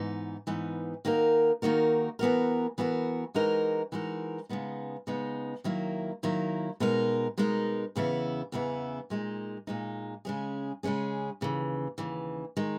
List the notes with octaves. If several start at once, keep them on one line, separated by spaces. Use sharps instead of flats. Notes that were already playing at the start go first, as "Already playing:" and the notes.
Already playing: G#2 E3 B3 D#4
G#2 E3 B3 D#4
D#3 A#3 D#4 F#4 A#4
D#3 A#3 D#4 F#4 A#4
E3 B3 F#4 A#4
E3 B3 F#4 A#4
E3 G#3 D#4 F#4 A#4
E3 G#3 D#4 F#4 A#4
C#3 G#3 B3 D#4
C#3 G#3 B3 D#4
D#3 F#3 A#3 E4
D#3 F#3 A#3 E4
B2 G#3 D#4 A#4
B2 G#3 D#4 A#4
E2 C#3 E3 B3 E4
E2 C#3 E3 B3 E4
A#2 G#3 D#4
A#2 G#3 D#4
C#3 G#3 C#4 G#4
C#3 G#3 C#4 G#4
D#2 C#3 E3
D#2 C#3 E3
D#3 G#3 D#4